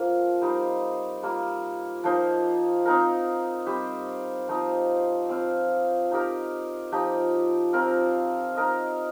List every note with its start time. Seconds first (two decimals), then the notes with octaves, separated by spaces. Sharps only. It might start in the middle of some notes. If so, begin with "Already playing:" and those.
Already playing: F3 A#3 C4 F4
0.42 G3 D#4 C5
1.23 G3 A#3 F4
2.04 F3 A#3 D#4 C5
2.86 C4 D#4 A#4
3.66 G3 C4 G4 C5
4.48 F3 C4 D#4 C5
5.29 C4 F4 C5
6.11 D#4 G4 A#4
6.92 F3 D#4 G4
7.73 C4 F4 A#4
8.55 D#4 A#4 D#5